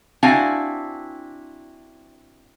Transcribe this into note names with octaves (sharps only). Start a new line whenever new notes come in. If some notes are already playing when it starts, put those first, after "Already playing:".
C4 D4 E4 F#4 F5 G#5